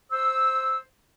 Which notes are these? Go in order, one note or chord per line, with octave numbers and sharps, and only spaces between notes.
C5 E6